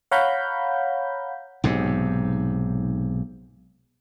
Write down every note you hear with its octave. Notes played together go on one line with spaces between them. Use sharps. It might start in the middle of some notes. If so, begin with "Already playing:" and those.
C#5 F5 F#5 A#5 B5 G6
B1 G#2 C3